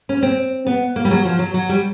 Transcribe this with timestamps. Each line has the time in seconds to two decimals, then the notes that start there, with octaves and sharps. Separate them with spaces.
0.09 C#4
0.23 C4
0.67 B3
0.96 A#3
1.05 G3
1.11 F#3
1.25 F3
1.39 F#3
1.54 F#3
1.69 G3